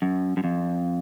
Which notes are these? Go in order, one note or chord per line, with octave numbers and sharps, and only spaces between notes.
F#2
F#2
F2